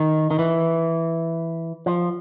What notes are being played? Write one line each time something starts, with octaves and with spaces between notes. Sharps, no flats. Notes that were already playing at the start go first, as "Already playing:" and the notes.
Already playing: D#3
D#3
E3
F3